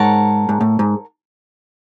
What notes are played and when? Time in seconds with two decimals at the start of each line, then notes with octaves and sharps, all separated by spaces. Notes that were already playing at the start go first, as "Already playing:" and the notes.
Already playing: G#2 A#4 C#5 F#5 A5
0.49 G#2
0.61 A2
0.79 G#2